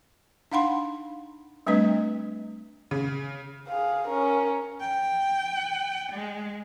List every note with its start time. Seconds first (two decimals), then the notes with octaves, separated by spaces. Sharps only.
0.52 D4 D#4 F5 F#5 B5 C6
1.67 G3 A3 C4 D4 B4 D#5
2.91 C#3
3.68 G#4 F5
4.08 C#4 A#4
4.81 G5
6.13 G#3